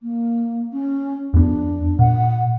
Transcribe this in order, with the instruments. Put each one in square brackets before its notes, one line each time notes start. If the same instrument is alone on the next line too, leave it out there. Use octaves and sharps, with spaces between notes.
[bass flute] A#3
C#4
[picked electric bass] F2 B3 [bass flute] D4
[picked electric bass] A#2 [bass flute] F#5